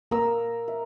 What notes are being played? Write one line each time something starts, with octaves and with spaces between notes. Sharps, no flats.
A#3 A#4 E6
E5